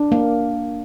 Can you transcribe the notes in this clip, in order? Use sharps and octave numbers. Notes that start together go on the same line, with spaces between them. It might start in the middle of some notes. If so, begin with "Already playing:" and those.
Already playing: D4
A#3